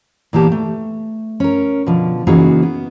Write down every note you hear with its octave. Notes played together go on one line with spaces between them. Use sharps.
A#2 E3 A#3 B3 G4 A5
A3
C#4 A#4
B2 D3 F3
C#3 E3 A#3 D#4 F#4 G#4
B3